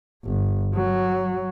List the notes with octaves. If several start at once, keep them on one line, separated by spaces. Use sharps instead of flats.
G1
F#3